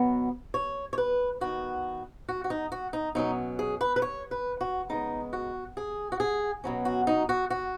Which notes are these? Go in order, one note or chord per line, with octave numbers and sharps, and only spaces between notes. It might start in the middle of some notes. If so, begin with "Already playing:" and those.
Already playing: B2 F#3 B3
C#5
C#5
B4
D#3 B3 F#4
F#4
F#4
D#4
F#4
D#4
B2 F#3 C#4 D#4
G#4
B4
B4
C#5
B4
F#4
C#3 G#3 B3 D#4
F#4
G#4
F#4
G#4
B2 F#3 C#4
F#4
D#4
F#4
F#4